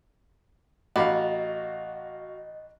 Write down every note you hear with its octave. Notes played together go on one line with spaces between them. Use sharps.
A1 F#4 D#5 F5 B5 D6